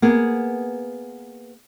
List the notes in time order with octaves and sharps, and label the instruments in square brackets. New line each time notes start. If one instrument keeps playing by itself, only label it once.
[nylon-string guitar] A#3 B3 G#4